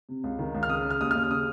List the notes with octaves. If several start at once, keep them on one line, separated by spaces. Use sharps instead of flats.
C3
C#2
D#3
C#2
F6
C#3 D#6
C#3
F6
D#2 D#6
D#2 F6
C#3 D#6